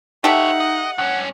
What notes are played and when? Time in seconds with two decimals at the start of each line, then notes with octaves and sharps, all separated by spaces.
0.24 D#4 F4 G4 A4 C#5 E5 F#5
0.60 D#5
0.98 G2 C#4 F#5